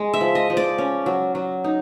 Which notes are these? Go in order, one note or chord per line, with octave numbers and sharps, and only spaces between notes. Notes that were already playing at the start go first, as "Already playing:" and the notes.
Already playing: G#3
E5
F3
D#5
F3
D5
C#4
F#3
F#3
D#4